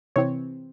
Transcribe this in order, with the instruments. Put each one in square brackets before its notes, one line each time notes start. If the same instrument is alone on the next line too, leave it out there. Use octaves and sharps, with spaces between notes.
[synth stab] C3 E3 C4 C#5